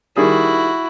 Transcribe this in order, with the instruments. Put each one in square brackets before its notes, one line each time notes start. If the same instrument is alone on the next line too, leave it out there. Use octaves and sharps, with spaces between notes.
[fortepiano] D#3 G3 G#4 [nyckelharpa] E4 F#4